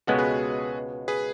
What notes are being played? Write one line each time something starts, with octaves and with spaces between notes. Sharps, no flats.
C#2 B2 G#3 B3 F#4 A4
G#4 B4
G#4 B4